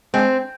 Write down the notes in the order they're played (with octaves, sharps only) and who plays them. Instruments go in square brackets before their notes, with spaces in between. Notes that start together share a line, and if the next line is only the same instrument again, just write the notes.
[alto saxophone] G#3 [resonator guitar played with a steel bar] C4